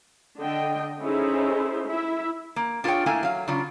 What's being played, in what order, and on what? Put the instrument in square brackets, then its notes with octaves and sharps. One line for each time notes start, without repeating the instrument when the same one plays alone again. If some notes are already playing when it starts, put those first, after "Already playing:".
[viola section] D3 D#5 G5
C#4 D#4 E4 G#4 A4 C5
E4 E5
[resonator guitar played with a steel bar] A#3
D4 F4 G#4 B4 C#5 G5
A3 A#3 E4 F5 G#5
F#3 F5
C#3 F#3 D4 F4 C#5